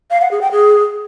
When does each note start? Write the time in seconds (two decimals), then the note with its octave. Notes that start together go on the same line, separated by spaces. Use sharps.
0.11 F5
0.21 F#5
0.31 G#4
0.41 G5
0.52 G#4